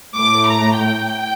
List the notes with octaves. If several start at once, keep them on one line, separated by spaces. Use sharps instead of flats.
A2 A3 D6
A#5
G5